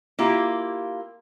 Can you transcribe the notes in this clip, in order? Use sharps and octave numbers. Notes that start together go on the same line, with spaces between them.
A#3 E4 F4 G4